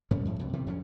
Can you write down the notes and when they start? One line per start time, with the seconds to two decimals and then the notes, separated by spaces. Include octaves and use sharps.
0.11 G2 G3 C#4
0.25 F2 A2
0.39 C2 F2 B2
0.53 C3 D#3 E3 G3
0.66 F2 D3 B3 C#4